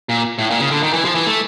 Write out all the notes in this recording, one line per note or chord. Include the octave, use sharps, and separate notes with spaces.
A#2
A2
A#2
C#3
D3
D#3
E3
F3
E3
A3